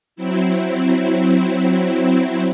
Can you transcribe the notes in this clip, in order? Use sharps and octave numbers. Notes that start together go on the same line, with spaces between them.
F#3 C4 E4